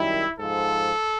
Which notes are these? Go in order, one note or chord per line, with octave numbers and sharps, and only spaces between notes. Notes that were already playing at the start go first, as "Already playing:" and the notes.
Already playing: F#2 D#3 G3 E4
G#2 F3 A4